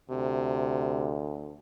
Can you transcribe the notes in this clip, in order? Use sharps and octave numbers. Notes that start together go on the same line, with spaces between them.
D2 C3